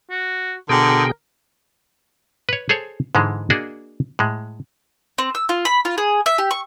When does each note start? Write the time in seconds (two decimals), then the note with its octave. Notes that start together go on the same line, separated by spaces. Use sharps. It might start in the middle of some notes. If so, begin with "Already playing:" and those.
0.10 F#4
0.69 B2 D3 G#4 A#4 G5
2.49 B4 C#5
2.69 G#4 A4 C5 C#5
3.15 G#2 D3 E3 G#3
3.50 A#3 D4 F#4 G#4 D#5
4.19 A2 G#3
5.18 C4
5.35 E6
5.49 F4
5.65 B5
5.85 F4
5.98 G#4
6.26 E5
6.38 G4
6.51 C#6